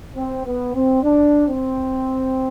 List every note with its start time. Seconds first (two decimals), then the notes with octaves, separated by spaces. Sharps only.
0.16 C4
0.45 B3
0.75 C4
1.03 D4
1.46 C4